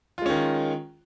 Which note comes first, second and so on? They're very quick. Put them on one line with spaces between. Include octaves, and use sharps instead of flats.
F4 G#3 C#4 D#3